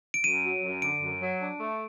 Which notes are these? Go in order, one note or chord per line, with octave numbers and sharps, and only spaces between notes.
D7
F#2 D#7
F#3
F#2
D3 D7
F#2
F#3
D4
A3